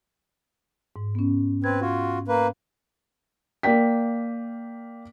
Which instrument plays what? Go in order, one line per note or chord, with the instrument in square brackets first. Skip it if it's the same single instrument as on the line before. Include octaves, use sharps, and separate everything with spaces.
[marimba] G#2
B3 C#4
[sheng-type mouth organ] C4 B4 [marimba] G#6
[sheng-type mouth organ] F4 F#4
A#3 B4
[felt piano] A#3 D5 G5 B6